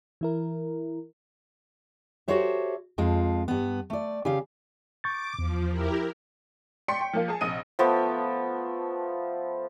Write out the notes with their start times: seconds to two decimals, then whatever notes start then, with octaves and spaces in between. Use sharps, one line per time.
0.21 E3 E4 A#4
2.28 F#4 G4 A4 C5 C#5 E5
2.98 F2 F3 G#3 F4
3.48 G2 B3
3.90 A3 D5
4.25 C#3 G4 F5
5.04 C#6 D6 G6 A6
5.39 E2 F3
5.70 E4 G4 A#4
6.88 D5 G5 C6 C#6 B6 C#7
7.01 G5
7.13 F3 A#3 F4
7.28 G#4 G#5 A5
7.41 A#1 C3 D#5 D#6 D#7
7.79 F3 A3 B3